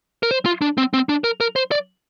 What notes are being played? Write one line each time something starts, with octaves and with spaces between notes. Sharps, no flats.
A#4
C5
F4
D4
C4
C4
D4
A#4
A#4
C5
D5